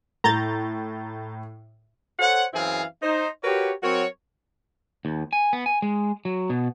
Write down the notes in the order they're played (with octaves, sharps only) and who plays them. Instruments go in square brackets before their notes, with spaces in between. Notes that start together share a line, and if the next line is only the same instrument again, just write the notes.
[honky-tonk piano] A2 [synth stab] A#5 G6 A6
[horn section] A4 C5 C#5 F#5
F#2 E3 C4 E4 G#4 F5
D#4 C5
F#4 G4 A#4 B4 C#5
F#3 C4 F#4 A#4 C#5
[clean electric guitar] D#2
G#5
B3
G#5
G#3
F#3
B2